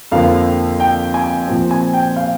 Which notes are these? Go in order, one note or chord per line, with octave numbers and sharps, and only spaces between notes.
F2 D3 F3 A#3 F5
G5
G#5
A#2 F3 C4
G#5
G5
F5